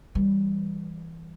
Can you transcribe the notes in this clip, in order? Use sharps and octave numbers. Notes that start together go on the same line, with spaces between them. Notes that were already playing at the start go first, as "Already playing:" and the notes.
E3 G3